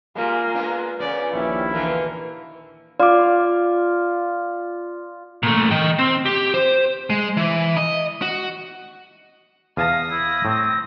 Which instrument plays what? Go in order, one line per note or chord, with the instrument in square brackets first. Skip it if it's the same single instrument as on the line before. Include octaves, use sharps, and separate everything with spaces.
[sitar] A#2 G3 G#3 [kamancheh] A#3 F4
[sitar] G#3 B3 D4
[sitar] A#2 C#3 B3 [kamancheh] D5
[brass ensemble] A#1 D#2 E4 [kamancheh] C#4 G4
[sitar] B2 D3 E3 [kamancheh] A#3
[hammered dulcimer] F4 [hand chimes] D5 D6
[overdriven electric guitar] A#2 A3
D#5 G5
C4
G4
C5
[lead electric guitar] G#3
E3
D#5
F#4
[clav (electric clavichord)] E2 G#5 A5 [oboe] F5 [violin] D#6 A#6
[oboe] E4
[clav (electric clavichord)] A2 [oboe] C4